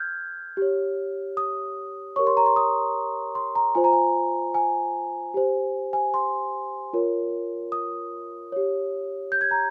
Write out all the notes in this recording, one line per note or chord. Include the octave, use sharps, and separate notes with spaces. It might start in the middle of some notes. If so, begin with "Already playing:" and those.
Already playing: F6 G6 G#6
G4 C#5
D#6
G4 A#4 C#5 C#6
C6
A#5
C6
D#6
C6
A#5
F4 C5 G#5
A#5
G#5
G#5
G4 C5
G#5
C6
F4 A#4 C#5
D#6
G4 C#5
G6
G#6
A#5